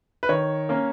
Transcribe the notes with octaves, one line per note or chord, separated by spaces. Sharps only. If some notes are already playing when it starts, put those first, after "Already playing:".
B4
D#3 C#5
A#3 C#4